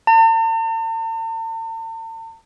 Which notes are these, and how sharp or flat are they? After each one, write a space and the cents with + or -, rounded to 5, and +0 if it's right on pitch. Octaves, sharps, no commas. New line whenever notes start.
A5 +45